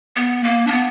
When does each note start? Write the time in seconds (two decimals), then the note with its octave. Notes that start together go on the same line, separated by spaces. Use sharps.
0.16 B3
0.44 A#3
0.67 D4
0.71 B3